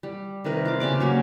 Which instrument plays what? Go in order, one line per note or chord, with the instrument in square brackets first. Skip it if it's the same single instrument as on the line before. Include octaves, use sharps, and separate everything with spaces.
[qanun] G3
C3 D#3 A#4 B4
F4 D6
C#3 G4 D5 D6
F#3 A#3 C#4